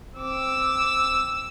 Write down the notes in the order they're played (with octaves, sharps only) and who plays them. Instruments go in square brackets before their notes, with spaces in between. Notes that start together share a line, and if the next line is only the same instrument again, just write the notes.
[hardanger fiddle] C4 D6 [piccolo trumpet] E6